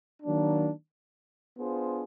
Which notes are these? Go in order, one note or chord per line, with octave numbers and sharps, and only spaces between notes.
D#3 F#3 A#3 D4
B3 D4 F4 G#4 C5